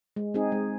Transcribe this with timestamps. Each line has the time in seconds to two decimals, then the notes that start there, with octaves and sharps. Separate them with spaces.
0.16 G#3
0.34 C4 D#4 G#4
0.52 G#3